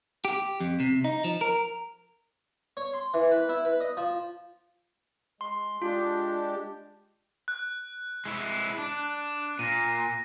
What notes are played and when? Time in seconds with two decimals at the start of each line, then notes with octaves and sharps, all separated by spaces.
0.25 G4
0.60 F2
0.80 C3
1.04 D#4
1.24 F3
1.41 A#4
2.77 C#5
2.94 C6
3.14 E3
3.31 B4
3.49 E4
3.65 B4
3.81 D#5
3.97 F3
5.41 G#3 C6
5.82 G#3 D4 F4 G4
7.48 F#6
8.26 G#3 E4
8.78 D4
9.59 A#2 A#6 D#7